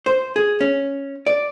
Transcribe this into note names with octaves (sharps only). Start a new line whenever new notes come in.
C5
G#4
C#4
D5